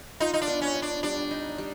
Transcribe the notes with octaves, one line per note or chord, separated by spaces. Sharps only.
D#4 F4
D#4
D4
B3
C#4
B3
D4
G3 D4
D#4
G3